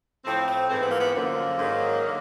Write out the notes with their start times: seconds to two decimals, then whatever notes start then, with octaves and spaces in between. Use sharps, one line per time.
0.24 A2 F3 C4
0.47 C4
0.69 G#2 E3 C4
0.80 B3
0.90 A#3
1.00 B3
1.14 F#2 D3 F3 A#3
1.58 G#2 D#3 F#3
2.05 D3